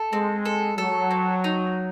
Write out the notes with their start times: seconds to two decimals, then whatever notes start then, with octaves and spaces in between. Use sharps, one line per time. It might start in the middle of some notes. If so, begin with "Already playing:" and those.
Already playing: A4
0.13 G#3 C4
0.45 A4
0.78 F#3 A4
1.11 C4
1.44 D#4